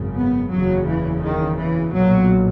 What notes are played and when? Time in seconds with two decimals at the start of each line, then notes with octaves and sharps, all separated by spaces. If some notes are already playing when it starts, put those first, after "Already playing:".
Already playing: G#1 F#2 C#3
0.15 B3
0.50 F#1 E2 C#3 F#3
0.87 E3
1.22 D#3
1.58 E3
1.93 B1 A#2 F#3